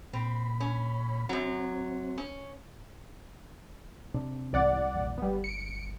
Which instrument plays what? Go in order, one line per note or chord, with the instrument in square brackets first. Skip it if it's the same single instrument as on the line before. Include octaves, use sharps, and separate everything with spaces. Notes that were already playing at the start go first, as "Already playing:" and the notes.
[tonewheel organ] A#2 B5 [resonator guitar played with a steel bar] C4
[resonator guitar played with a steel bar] C#4
[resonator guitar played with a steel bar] F#2 F#3 [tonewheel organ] C4
[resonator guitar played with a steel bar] C#4
[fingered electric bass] C3 C4 D4
[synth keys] C2 D5 F#5 [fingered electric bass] G#2 E3 C4
[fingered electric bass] A#1 E2
[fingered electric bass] G1 [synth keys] G3 B3
[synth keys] C#7 D7